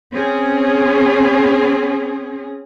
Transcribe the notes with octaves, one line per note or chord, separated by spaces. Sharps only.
C4 C#4 G#4